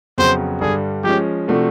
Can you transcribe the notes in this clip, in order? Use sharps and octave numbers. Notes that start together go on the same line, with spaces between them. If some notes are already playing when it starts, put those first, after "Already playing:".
F2 C#3 F#3 B3 C5
G2 D3 G3 G#4
F3 G#3 C#4 G4
C3 F3 A3 D4 F#4